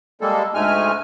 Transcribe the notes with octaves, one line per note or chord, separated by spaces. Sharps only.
G3 G#3 A#3 A4
D2 G#2 G#3 A3 G#5 F6